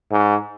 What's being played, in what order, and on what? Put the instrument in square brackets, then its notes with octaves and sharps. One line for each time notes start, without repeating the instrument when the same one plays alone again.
[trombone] G#2